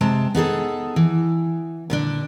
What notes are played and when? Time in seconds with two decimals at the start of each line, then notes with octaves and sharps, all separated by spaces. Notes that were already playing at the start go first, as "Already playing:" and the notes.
0.01 C3 G#3 C4 A5
0.35 B3 D#4 G#4 A4
0.96 E3
1.90 A#2 D3 D4